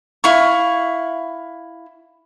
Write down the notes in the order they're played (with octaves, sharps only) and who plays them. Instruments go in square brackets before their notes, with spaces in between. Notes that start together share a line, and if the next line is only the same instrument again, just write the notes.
[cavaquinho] E4 F5 C#6